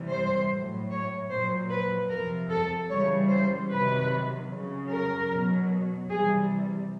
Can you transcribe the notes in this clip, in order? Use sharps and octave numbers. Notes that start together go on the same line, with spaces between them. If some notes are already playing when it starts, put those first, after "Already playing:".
Already playing: C3 E3 G3
C5
A2 F#3
C#5
A#2 F#3 C5
B4
C3 F3 A#4
A4
C#3 E3 G3 C#5
C5
C3 D#3 F#3 B4
C#3 F#3
A#4
B2 F#3
C3 E3 G3 G#4